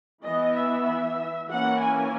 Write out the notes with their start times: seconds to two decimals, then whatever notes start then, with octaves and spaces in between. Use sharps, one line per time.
0.24 E3 B3 D#5
0.55 E5
1.49 E3 A#3 C#4 F#5
1.80 G#5